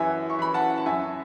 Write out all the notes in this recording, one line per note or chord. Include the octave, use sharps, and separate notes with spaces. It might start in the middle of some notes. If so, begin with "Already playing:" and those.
Already playing: F#2 E3 E5 G#5
C#6
E3 B5
F#5 A5
A5
F#2 E5 G#5